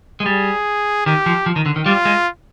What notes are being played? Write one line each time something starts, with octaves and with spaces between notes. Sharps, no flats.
G#3
G3 G#4
D#3 G4
F3
F3
D#3
D3
D#3
G3 F4
G#3